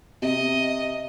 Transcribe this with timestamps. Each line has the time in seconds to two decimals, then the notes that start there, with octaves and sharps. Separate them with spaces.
0.22 C3 D#5